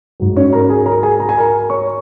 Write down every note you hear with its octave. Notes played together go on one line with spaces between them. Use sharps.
G#2 F#3
C#4 C#5
A#4 A#5
G#4 G#5
A#4 A#5
G#4 G#5
A#5
G#5
A#4 A#5
C#5 C#6